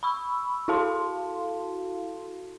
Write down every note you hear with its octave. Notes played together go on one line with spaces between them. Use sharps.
B5 C#6 E6
E4 F#4 A4 F5 A5 C6